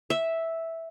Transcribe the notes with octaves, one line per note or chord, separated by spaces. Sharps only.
E5